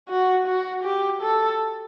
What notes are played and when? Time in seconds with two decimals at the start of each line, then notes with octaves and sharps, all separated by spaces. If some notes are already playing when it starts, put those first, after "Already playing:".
0.08 F#4
0.46 F#4
0.83 G4
1.21 A4